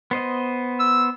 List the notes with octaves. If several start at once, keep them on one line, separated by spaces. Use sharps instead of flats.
B3 C5 D#5
E6